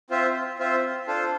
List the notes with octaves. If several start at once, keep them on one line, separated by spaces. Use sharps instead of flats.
C4 F4 C5 E5
C4 F4 C5 E5
D4 F4 A4 C5